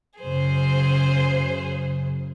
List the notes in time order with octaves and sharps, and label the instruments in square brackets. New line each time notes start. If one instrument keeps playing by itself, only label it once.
[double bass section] F#2 C#3 [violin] G#4 C5